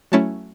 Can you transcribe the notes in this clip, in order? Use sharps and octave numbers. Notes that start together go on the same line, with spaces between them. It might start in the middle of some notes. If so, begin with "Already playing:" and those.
F#3 A3 C#4 E4 A5